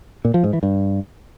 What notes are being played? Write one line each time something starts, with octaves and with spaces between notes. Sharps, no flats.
A#2
F3
G#2
E3
G2